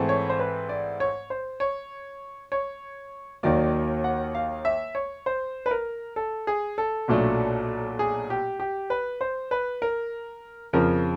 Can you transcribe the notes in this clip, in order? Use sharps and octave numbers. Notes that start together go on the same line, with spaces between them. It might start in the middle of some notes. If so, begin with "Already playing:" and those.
Already playing: G#2 E3 A3 C4
C#5
C5
B4
D5
C#5
C5
C#5
C#5
D#2 D#3 F#3 A#3 D5
F#5
F5
E5
C#5
C5
B4
A#4
A4
G#4
A4
B1 A#2 F#3 A3 D4
G#4
G4
G4
B4
C5
B4
A#4
F2 C#3 F3 A#4